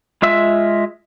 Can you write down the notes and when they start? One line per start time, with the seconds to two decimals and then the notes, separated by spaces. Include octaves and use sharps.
0.22 G#3 F4 E5 E6